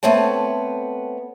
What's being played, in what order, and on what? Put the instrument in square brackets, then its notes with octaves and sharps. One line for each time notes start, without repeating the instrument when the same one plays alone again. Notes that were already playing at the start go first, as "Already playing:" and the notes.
[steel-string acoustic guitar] A3 B3 C4 C#5 A5